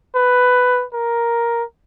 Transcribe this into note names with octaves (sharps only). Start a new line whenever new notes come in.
B4
A#4